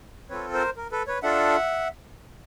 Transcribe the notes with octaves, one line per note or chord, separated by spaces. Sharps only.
C4 F4 A4 B4 C#5
A#4 C5
A#4
A4 B4
B4 C#5
D4 F4 A4 E5 F#5